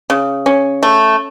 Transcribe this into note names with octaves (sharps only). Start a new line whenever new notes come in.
C#3
C#4
A3